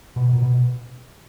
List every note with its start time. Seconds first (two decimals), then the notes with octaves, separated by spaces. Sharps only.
0.16 B2
0.33 A#2
0.42 B2